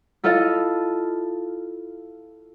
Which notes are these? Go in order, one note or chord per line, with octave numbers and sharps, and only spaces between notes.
E4 F4 A4 D#5 F5